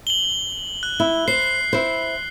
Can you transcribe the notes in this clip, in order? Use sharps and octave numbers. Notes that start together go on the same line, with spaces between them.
F#7 G7
F#6
E4
C5 C7
E4 C5